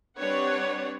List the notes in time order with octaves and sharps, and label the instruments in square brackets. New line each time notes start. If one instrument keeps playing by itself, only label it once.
[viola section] G3 C4 D4 B4 C#5 F#5